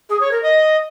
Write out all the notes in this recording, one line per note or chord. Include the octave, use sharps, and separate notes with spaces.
G#4
C#5
A#4
D#5